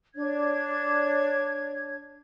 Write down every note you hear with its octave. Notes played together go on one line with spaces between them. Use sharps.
D4 C#5 G#6